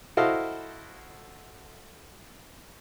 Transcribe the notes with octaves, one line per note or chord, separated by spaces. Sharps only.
E4 F#4 A4 C5 D#5 F5